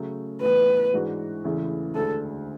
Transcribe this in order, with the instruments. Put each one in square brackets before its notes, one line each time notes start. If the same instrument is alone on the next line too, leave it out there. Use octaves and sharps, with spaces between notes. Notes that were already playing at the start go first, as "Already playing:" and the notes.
Already playing: [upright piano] C#3 F#3 A3
[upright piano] A2 E3 B3 [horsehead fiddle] B4
[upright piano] G#2 E3 G#3 D4 F#4
E2 C#3 E3 A3 E4
[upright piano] D2 D3 G#3 [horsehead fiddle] A4